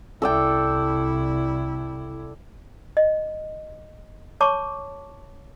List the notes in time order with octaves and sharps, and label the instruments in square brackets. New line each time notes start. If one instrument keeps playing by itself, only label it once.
[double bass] C2 E4 [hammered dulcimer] A4 D5 G5
[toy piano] D#5
C#5 A5 C#6 D6